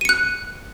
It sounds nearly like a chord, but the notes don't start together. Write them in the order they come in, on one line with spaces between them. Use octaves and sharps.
D#7 C#7 F#6